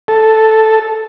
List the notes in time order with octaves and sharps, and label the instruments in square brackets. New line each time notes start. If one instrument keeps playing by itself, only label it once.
[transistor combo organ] A4